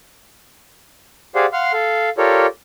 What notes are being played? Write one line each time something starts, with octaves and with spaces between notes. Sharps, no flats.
G4 G#4 C5 D5 F5 F#5
F5 F#5 C6 F6
A4 F5
F4 G4 A4 A#4 C#5 D5